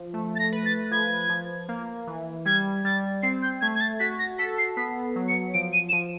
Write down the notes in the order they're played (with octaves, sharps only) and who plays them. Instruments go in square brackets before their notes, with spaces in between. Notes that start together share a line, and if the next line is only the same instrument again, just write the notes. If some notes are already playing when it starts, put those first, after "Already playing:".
Already playing: [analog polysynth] F3
A3
[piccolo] A6
A#6
[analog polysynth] B4
[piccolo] A6
[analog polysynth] F3 [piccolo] G#6
[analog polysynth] F3
A#3
E3
[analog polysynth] G3 [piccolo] G#6
[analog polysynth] G3 [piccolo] A6
[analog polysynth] C4 [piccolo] C7
[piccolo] G6
[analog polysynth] A3 [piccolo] G#6
[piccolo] G#6
A6
[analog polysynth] F#4 [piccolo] B6
[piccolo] A#6
[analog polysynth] A4 [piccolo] B6
[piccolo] C7
[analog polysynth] B3 [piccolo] B6
[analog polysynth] F#3
[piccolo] C#7
[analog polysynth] F3 [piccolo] D7
[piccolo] D#7
E7
[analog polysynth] F3 [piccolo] D#7